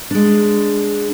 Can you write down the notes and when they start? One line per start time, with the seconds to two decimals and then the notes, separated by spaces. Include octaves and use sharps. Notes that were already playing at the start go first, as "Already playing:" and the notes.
0.11 G#3 D4